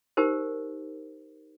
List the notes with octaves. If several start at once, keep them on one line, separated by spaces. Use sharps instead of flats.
D#4 G4 A#4 C5